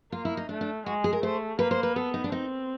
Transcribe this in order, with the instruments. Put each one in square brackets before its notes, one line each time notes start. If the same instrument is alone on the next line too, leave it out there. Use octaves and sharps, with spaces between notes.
[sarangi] A#3 [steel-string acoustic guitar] F4
[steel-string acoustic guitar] E4
D#4
[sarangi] A3 [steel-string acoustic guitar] D4
[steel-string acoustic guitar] D4
[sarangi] G#3 [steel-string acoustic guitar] F#4
[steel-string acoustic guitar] G#4
A#4
[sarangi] A3 [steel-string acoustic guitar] C5
[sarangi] A#3 [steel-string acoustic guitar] B4
[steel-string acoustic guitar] C5
B4
[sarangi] B3 [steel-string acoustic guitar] A4
[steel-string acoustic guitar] D#4
D4
[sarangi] C4 [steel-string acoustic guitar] D#4